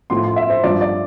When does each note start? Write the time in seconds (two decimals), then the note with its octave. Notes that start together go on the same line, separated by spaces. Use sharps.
0.10 A2 F3 C6
0.24 C6
0.36 E5
0.50 C5
0.64 G2 F3 D5
0.81 D5